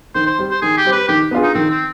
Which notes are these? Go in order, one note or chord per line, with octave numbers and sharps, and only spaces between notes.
D#3 C5
C5
G3 C4
C5
D#3 G#4
G4
G3 C4
B4
D#3 G4
B3 D4 F4 G#4
D#4
D#3 C4
C4